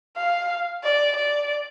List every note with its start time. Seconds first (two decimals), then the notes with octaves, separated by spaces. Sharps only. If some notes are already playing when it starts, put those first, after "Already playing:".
0.17 F5
0.84 D5
1.17 D5